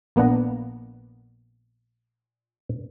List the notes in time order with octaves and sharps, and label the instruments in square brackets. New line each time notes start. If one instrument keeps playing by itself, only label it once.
[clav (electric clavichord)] A#1 A#3 B3 D4 F#5 A#5